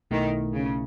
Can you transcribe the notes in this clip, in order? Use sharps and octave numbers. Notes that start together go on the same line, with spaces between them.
B1 B2 D#3 A3 E4
C#3